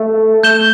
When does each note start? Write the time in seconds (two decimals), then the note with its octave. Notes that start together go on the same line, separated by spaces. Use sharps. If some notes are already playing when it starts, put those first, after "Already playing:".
Already playing: A3
0.43 A3 G6 E7 G7